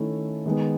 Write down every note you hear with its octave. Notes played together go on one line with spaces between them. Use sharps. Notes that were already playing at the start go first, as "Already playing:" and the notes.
Already playing: D#3 A3 C#4 E4 A4
D#3 G#3 B3